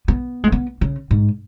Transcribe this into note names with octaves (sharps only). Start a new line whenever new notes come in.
B3
G#3
B3
C#3
G#2